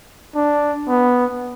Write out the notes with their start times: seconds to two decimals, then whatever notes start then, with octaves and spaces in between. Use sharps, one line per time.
0.35 D4
0.88 B3